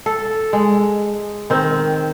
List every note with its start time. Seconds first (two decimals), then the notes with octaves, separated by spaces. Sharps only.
0.06 A4
0.53 G#3
1.50 D#3 C4